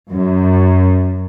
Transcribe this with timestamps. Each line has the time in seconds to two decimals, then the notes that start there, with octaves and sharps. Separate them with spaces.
0.11 F#2